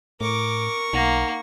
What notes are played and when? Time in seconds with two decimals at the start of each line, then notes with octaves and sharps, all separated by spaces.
0.21 A2 A#4 C#6 D6
0.93 B1 A#3 D#4 F#5 A#6